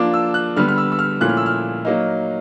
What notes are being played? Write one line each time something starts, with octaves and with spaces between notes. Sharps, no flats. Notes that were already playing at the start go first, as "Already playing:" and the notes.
Already playing: F3 A#3 D4 F4 D6
E6
F#6
D3 G3 B3 F6
F6
E6
E6
F6
A#2 F3 A3 C#4 E4 F#6
F6
E6
F6
F#3 A#3 D#4